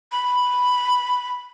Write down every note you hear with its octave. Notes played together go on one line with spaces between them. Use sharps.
B5